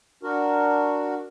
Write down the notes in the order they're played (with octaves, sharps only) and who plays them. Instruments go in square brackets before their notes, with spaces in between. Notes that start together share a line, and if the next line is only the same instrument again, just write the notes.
[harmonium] D4 F#4 A#4